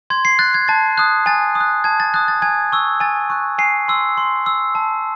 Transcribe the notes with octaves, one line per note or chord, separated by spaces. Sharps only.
C6 G#6
C7
F#6 A6
G#6
A5 A6
D#6 F#6
G#5 A6
D#6
F#6
A5 G#6
A6
D#6 F#6 A6
A6
G#5 G#6
C#6 E6
G#5 A6
C#6 F#6
G#5 C7
C6 E6
C6
E6
A5